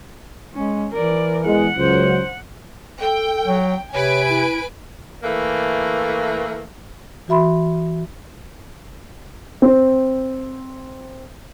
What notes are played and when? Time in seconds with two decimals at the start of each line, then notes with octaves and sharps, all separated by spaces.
0.54 G#3 C#4
0.93 E3 A#4 D5
1.45 E2 G#3 F#5
1.77 C#2 F#3 C5
3.00 A4 G5
3.45 F#3
3.93 C3 B4 C#5 G#5 D7
4.29 E4
5.23 E3 A3 A#3
7.28 E3 F#4 E5 B5 C6
9.62 C4 C5